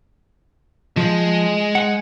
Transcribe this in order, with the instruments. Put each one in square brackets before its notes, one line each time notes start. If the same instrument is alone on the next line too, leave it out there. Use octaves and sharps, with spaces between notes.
[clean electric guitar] F3 [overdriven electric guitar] G#3
[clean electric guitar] F#5